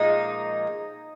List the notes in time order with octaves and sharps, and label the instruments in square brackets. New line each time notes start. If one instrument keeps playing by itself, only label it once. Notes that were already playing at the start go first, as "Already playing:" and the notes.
Already playing: [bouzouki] A#2 F3 G#3 D#4